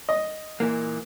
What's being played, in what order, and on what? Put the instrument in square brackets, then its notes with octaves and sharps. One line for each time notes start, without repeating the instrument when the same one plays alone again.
[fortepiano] D#5
[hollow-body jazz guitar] A#2 E3 A#3